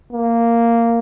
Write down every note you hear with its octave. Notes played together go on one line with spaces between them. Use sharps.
A#3